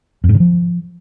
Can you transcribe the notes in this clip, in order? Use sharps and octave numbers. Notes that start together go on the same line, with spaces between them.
F2
G#2
C#3
F3